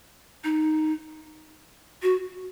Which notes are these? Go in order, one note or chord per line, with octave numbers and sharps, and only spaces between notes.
D#4
F#4